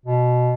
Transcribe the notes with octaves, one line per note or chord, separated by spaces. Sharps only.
B2